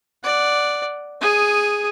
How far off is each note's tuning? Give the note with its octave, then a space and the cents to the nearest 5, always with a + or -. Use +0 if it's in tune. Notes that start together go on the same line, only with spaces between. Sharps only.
D5 +0 F#5 +0
G#4 +0 D#6 -10